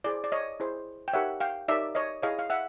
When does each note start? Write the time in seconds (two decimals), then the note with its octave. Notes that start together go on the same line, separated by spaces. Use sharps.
0.04 E4 G#4 C5 D5
0.24 D5
0.32 C#5 D#5
0.60 E4 G#4 C5
1.08 G5
1.13 D#4 G4 A#4 C#5 E5 F#5
1.40 F5 G5
1.68 D#4 G4 A#4 C#5 D5 E5
1.95 C#5 D#5
2.22 E4 G#4 C#5 D#5 F5
2.39 F5
2.50 E5 F#5